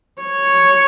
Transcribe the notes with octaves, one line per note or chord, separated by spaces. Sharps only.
C#5